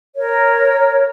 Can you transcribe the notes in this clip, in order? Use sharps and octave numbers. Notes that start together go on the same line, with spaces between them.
A#4 C#5